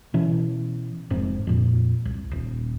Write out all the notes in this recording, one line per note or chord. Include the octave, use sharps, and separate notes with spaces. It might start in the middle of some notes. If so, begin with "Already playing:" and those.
B2 E3 C#4
F1 G#2 C4
F2 A#2
C2
D#1